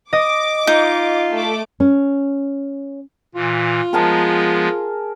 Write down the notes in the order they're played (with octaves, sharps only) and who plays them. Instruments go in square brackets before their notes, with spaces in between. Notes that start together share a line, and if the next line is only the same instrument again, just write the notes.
[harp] D#5 [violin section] D6
[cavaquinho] D#4 [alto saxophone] F4
[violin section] A3 D6
[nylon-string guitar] C#4
[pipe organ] A#2 E3 [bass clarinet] F4
[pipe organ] F3 G#3 B3 [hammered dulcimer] G#4 A#4 A5